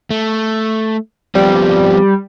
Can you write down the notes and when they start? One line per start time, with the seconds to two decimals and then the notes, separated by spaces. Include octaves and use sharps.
0.10 A3
1.35 F3 G3 B3 C4